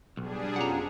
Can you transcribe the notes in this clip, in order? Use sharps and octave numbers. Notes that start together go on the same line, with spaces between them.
B1 G3 D4 G#4
F2 B2 C#4 F4 F#5 A#5